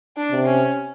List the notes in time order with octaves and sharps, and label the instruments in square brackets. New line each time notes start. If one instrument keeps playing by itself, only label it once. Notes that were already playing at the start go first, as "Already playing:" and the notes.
[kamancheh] D4
[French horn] C3
[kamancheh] C#4